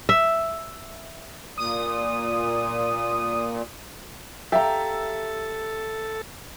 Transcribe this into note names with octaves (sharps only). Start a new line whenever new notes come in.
E5
A#2 D#6
G4 A4 E5 F5 A#5